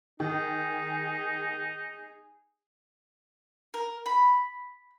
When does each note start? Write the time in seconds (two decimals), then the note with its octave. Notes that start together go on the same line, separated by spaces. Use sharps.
0.20 D#3 D#4 G#4
3.74 A#4
4.06 B5